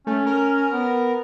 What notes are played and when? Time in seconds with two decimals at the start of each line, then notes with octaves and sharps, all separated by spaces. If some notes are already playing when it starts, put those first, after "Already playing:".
0.07 A3 C#4
0.26 A#4
0.71 B3